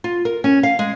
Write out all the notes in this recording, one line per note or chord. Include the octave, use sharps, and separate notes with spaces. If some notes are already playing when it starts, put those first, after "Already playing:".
F4
A#4
C#4
F5
G#3